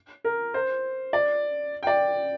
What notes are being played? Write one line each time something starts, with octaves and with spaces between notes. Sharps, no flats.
A#4
C5
D5
G5
D5